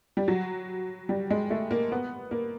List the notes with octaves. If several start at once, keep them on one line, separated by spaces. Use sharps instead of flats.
G3
F#3
G3
G#3
A3
A#3
B3
A#3